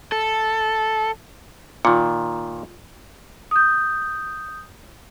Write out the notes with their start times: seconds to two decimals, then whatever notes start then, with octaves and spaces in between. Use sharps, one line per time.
0.12 A4
1.85 A#2 D#3 F4
3.51 D#6 G6